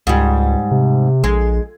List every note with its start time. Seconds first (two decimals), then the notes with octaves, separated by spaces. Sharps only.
0.07 C#2 G#2 G3
0.71 C3
1.24 A#1 G#3